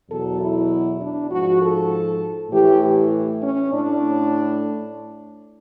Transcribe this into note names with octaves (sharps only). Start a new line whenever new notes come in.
E2 B2 F#3 A4
E4
D4
G#2 F3 F#4
A4
A2 E3 G4
C#4
A2 D4